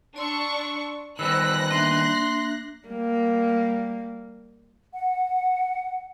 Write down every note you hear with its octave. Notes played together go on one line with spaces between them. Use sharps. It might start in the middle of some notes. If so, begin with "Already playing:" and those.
D4 D5 C6 C#6 E6
D#3 G3 B3 C5 B5 E6 F#6 A#6
A#3 D4 E5 C6
G3 A#3
F#5